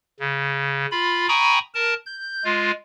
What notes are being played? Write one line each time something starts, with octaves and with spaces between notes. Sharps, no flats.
C#3
F4 B5
G5 G#5 A#5 B5 C#6 D#6
A#4 A5
G6
G#3 F4